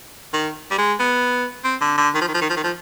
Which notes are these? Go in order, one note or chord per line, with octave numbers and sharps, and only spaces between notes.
D#3
G3
G#3
B3
C4
D3
D3
D#3
F3
D#3
F3
D#3
F3
D#3
F3